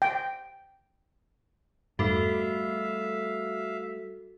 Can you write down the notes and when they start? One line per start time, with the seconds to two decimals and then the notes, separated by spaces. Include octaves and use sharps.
0.02 G5
1.99 F2 G#2 G3 A3 F#4 A4 E5 F5